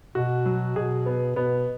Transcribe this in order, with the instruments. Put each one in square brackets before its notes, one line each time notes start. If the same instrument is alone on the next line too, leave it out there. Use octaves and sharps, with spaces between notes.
[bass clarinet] B2 [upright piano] F#4
[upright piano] F#3
[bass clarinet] B2 [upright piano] G#4
[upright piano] B3
[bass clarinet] B2 [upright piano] B3